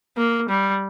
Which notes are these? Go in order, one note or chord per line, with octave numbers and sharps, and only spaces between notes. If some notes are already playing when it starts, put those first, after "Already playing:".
A#3
G3